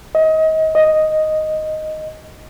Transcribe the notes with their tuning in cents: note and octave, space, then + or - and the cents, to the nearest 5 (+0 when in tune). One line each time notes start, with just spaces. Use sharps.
D#5 +30
D#5 +0